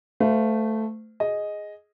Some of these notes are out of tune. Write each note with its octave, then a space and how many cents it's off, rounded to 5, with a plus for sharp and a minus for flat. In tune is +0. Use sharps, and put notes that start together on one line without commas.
A3 +0 C5 -40 F5 +0
G#4 +0 D#5 +0